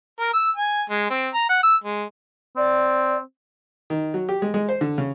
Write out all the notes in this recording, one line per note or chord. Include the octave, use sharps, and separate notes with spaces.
A#4
E6
G#5
G#3
C4
A#5
F#5
E6
G#3
C4 D5
D#3
F#3
G4
G#3
G#3
C5
D3
C#3